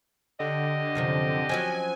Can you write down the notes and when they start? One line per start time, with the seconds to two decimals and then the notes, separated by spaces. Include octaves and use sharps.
0.40 D3 G4 D#5
0.95 F#2 C3 F3
1.49 F3 F#3 C#4 G#5